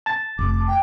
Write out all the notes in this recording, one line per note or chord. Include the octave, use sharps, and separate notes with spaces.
A5 A6
F1 D6
G5